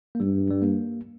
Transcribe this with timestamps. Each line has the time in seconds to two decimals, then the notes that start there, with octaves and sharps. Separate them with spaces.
0.15 A#3
0.20 G2 G3
0.50 G3
0.62 A#3